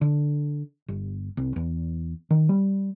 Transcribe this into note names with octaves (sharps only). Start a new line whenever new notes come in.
D3
G1
C2
E2
D#3
G3